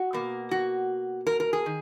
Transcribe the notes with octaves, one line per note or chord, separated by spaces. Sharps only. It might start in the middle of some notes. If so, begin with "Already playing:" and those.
Already playing: F#4
B2 A#3
F#4
A#4
A#4
G#4
D#3